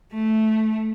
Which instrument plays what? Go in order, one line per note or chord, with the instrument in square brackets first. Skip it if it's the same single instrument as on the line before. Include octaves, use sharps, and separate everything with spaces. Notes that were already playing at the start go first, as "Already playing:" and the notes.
[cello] A3